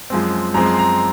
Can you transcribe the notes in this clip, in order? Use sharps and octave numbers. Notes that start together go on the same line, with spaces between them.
F#2 F3 G#3 C4
F#2 F3 G#3 C4 A#5
C6
A#5